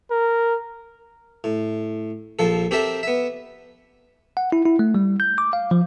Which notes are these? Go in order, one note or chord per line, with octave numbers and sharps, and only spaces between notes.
A#4
A2
A#1 F3 A4
C4 G4 A4 A#4 E5
B3 E5
F#5
E4
E4
A3
G3
G6
D6
F5
F3